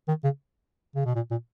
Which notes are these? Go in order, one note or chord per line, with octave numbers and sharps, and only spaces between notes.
D#3
C#3
C#3
B2
A#2
A#2